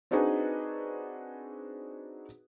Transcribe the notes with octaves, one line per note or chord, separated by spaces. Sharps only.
C4 D4 D#4 F#4 G#4 B4